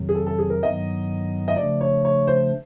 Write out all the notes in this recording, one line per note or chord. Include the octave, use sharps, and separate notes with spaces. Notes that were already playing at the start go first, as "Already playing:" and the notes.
Already playing: F2 C3 D#3 F#3
G#4
A4
A4
G#4
A#4
G2 D#3 F#3 B3 D#4 D#5
D#5
C#3 F3 A3 D4 D5
C#5
C#5
C5